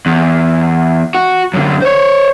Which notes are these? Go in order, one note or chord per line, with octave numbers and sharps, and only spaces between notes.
E2
F#4
F#2 D3
C5 C#5